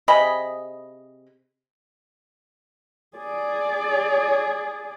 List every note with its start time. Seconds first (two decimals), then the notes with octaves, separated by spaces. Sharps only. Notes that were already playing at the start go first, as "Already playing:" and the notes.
0.08 C3 G#4 D#5 B5
3.17 G#4 D5